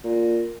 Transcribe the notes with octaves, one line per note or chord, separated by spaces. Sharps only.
A#2